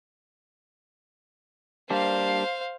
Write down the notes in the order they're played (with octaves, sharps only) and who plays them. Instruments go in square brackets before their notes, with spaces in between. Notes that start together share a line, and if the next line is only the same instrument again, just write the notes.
[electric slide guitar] G3 A#3 D4 [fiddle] C5 F5